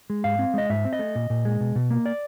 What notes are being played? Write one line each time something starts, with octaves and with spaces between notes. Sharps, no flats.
G#3
G#2 F5
C4
G#3 D#5
G#2 E5
C4
D#5
A3
A#2
A#2
G#3
B2
B2
A#3
D5